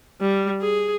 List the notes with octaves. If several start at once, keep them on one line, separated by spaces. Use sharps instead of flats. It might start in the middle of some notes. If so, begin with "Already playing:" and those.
G3
G#4